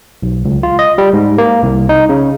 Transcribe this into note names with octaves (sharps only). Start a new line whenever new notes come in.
B1
C#2
F4
D#5
G3
G#2
A#3
C2
D#4
C#3